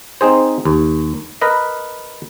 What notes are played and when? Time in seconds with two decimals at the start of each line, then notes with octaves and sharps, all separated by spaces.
0.21 C4 D#4 G#4 C5
0.65 D#2
1.42 A#4 B4 D#5